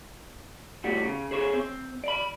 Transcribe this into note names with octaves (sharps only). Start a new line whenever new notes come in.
A2 G3 F#4
C#3
G#4 C5 C#5
C4
D5 B5